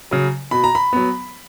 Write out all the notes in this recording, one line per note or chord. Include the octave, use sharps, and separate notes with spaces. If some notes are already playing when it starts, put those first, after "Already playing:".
C#3 F#3
B2 B5
A#5
B5
F#3 B3